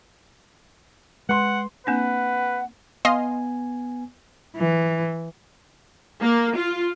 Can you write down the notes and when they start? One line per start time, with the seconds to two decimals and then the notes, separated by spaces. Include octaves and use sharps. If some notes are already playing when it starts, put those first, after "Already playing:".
1.29 G#3 B4 F#5 C6
1.87 A#3 C4 D4 B4 F#5
3.05 B3 D#5 F5 G#5 C6
4.57 E3
6.21 A#3
6.57 F4